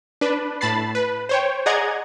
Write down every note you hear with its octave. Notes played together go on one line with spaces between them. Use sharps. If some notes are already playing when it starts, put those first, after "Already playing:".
D4 B4
A2 A5 B5 A6 C7
B4
C5 C#5 G5
G#4 D5 D#5 F#5 A#5 G#6